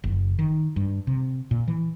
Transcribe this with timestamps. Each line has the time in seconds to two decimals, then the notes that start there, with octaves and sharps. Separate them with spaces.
0.04 F#1
0.39 D#3
0.76 G2
1.07 C3
1.51 A#2
1.68 E3